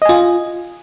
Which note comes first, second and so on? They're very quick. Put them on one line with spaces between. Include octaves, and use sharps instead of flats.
D#5 G#5 F4